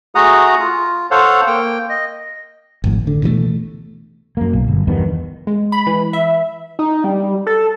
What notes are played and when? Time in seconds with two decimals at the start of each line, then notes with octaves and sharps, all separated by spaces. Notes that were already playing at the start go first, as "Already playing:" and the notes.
0.15 A3 F#4 G#4 F#5 A#5 D#6
0.60 F4
1.11 A4 C5 C#5 F5 F#5
1.47 A#3 G5
1.89 D#5
2.84 G#1 F2 A2
3.07 D3
3.23 B2 E3 F3 A3
4.37 F#2 A#3
4.53 B1
4.68 G1
4.87 E2 G2 D#3 B3
5.47 G#3
5.72 B5
5.86 E3
6.13 E5
6.79 D#4
7.04 G3
7.47 A4